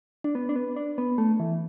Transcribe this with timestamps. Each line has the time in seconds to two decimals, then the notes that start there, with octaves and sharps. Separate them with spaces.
0.24 D4
0.35 B3
0.49 D4
0.56 B3
0.76 D4
0.98 B3
1.18 A3
1.40 E3